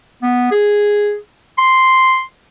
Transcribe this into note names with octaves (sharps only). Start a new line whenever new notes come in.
B3
G#4
C6